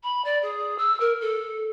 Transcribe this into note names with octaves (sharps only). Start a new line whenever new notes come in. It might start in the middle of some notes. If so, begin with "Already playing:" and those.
B5
D5
G#4
E6
A#4
A4